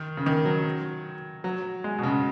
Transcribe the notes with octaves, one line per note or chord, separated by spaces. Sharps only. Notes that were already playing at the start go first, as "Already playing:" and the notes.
Already playing: D#3
C#3
D#3
F#3
F#3
G#3
B2
C#3